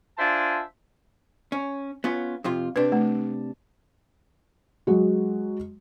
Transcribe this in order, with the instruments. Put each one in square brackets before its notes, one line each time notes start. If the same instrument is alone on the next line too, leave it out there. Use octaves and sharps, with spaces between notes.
[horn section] D4 F4 C5 E5 G#5 A5
[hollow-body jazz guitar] C#4
B3 C#4 F4
F2 C3 F4
[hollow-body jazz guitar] C3 D4 [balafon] B4
[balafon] A3
[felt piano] F#3 G#3 F#4